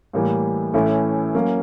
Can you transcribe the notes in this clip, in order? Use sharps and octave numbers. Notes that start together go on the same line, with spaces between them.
A2 E3 G3 A#3
A2 E3 A3 C#4 E4
F#3 A#3 C#4